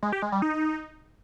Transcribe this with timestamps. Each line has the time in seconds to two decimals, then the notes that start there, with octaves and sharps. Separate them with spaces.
0.03 G#3
0.12 G4
0.22 G#3
0.32 G3
0.42 D#4